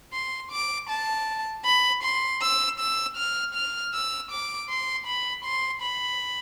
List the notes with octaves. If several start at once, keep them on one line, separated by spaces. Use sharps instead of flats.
C6
D6
A5
B5
C6
E6
E6
F6
F6
E6
D6
C6
B5
C6
B5